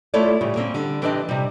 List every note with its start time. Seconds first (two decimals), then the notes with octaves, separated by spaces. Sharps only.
0.14 A3 E4 F4 A4 C#5 D5
0.41 A2 C#3 G3
0.56 A#3 C4 C#4
0.74 D3 G3
1.02 E3 C4 D4 G4 D#5 A5
1.29 C3 G3